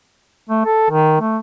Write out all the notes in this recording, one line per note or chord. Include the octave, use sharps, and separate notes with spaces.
A3
A4
D#3
A3